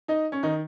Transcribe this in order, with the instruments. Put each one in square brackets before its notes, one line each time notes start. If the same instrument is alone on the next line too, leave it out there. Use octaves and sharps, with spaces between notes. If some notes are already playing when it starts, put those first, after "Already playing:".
[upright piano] D#4 D#5
C#4
D#3 D#4